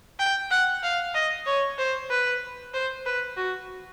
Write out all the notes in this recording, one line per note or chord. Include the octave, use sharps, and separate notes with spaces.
G5
F#5
F5
D#5
C#5
C5
B4
C5
B4
F#4